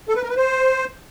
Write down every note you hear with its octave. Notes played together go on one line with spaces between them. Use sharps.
A4
B4
A#4
B4
C5